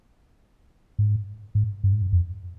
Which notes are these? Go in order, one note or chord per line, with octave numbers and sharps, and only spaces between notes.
G#2
G#2
G2
G#2
G2
F2